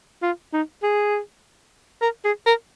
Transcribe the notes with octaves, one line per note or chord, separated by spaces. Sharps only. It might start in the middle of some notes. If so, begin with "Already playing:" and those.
F4
D#4
G#4
A#4
G#4
A#4